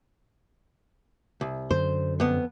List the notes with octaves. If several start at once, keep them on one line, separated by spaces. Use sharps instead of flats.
C2
F#2 D3 C5
F2 B3